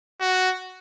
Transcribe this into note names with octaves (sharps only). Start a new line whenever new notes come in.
F#4